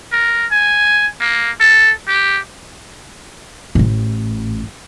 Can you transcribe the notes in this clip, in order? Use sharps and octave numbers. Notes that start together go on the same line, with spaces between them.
A#4
G#5
A#3
A4
G4
A1 A2